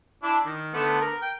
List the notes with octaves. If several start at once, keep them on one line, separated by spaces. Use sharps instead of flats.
D4 E4
D#3
D3 A3 B3
A#4
G5